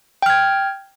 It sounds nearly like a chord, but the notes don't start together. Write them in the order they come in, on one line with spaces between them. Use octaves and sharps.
G5 F6 G#6